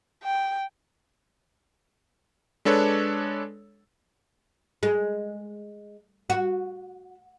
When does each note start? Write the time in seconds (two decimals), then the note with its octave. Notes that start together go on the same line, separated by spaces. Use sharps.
0.23 G5
2.65 G#3 D4 A4 B4 C#5
4.83 G#3
6.30 F#4